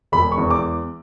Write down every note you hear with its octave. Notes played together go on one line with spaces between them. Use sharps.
E1 B5
C#6
E2
D6